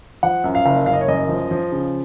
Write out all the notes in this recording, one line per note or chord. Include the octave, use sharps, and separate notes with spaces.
F3 F#5
F#2
F5
F#1
F#1 F5
D#5
C#5
F#2 D#5
F3
F3
C#3